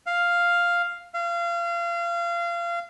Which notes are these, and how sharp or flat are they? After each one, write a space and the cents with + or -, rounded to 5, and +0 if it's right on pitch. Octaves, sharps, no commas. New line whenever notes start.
F5 +0
F5 -30